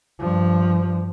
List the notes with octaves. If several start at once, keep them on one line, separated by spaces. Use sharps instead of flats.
G2 F3